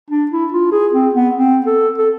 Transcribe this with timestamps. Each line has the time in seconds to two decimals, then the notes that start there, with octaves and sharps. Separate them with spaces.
0.10 D4
0.31 E4
0.52 F4
0.72 G#4
0.93 C4
1.14 B3
1.35 C4
1.66 A4
1.98 A4